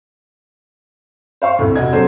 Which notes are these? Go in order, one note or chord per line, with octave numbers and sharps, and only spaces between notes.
C5 F5 C#6
D2 A2 C3
F1 F#4 D#5 G#6
D3 F#3 A#3 C4 A4 C5